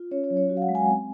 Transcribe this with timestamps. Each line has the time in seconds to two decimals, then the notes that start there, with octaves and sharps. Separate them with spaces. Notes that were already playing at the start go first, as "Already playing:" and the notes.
Already playing: F4
0.11 C#4 C#5
0.24 C#5
0.30 F#3
0.37 C#5
0.49 F#4
0.57 F5
0.62 F#5
0.68 G#3
0.75 G#5
0.87 C4